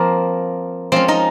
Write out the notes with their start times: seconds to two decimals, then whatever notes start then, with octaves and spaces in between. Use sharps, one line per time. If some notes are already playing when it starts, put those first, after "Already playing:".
Already playing: F3 A#3 C4 A#4
0.92 F3 G#3 C4 C#4 C5
1.08 D#4 D#5